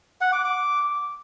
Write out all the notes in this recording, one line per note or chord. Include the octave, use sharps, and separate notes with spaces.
F#5
D6
D6